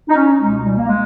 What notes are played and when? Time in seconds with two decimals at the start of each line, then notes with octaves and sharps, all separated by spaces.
0.09 D#4
0.15 C#4
0.40 C#2 B2 G#3
0.64 G3
0.77 A#3
0.88 G#3